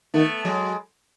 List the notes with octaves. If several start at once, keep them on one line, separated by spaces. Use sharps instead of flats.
D#3 A3 B3
F#3 G#3